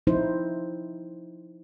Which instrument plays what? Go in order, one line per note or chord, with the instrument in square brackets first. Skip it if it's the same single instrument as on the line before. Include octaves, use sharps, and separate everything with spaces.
[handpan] F3 C4 D#4 E4 C5